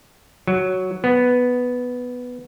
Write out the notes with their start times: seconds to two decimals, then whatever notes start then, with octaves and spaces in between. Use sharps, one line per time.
0.47 F#3
1.04 B3